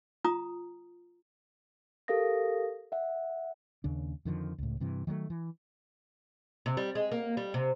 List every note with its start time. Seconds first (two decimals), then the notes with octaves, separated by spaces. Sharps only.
0.24 F4 A#5 D#6
2.08 G4 A4 A#4 F5 D#6 A#6
2.92 E5 F#5
3.84 D#2 C#3 D4
4.25 F2 D3 D#3 F3
4.58 C#2 A2
4.80 G2 C3 E3
5.07 D#3 F#3 G#3 A3
5.30 E3
6.66 C3
6.77 G3
6.95 G#3
7.12 A#3
7.37 G3
7.54 C3